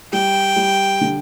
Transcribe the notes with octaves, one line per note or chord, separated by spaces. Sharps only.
G3 G5
G3
D3